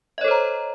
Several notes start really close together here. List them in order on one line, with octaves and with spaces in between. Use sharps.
D#5 C#5 A4 C5 A#5